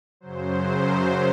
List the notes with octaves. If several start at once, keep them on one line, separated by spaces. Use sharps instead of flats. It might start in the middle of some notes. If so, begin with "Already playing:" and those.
F#2 C#3 F#3 C5